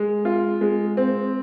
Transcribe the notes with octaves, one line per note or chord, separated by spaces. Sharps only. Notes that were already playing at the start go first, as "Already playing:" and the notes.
Already playing: G#3
F4
G#3
C4